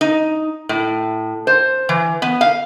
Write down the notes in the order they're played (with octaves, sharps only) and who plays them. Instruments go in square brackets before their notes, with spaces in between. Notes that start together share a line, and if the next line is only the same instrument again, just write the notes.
[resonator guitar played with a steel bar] D#4
A2
C5
E3
B3
F5